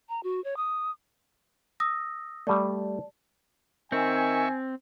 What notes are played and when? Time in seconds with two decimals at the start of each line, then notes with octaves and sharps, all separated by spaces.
0.09 A#5
0.23 F#4
0.44 C#5
0.57 D#6
1.80 D#6 E6 A#6
2.47 G3 A3 D5 A5
3.92 D#3 C4 E5 G#5 C#6